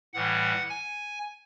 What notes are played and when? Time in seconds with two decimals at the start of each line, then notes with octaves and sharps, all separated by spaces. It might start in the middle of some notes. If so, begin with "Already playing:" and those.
0.14 A2 E3 G3 F#5
0.69 G#5